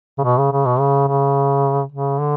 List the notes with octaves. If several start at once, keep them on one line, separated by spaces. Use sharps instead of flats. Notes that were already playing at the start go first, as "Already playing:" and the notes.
C#3
B2
C#3
C#3
B2
C#3
C#3
C#3
D3